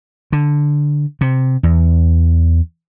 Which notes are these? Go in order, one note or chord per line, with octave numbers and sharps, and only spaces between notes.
D3
C3
E2